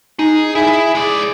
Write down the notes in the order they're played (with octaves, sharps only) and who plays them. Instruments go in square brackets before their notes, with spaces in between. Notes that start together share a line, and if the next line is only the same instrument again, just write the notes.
[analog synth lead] D#4 [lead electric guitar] G#4
[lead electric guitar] E4 [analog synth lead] G#4
[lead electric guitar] G#3 D5